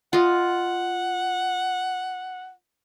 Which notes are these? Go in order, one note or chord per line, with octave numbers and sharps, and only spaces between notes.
F4 D#5 F#5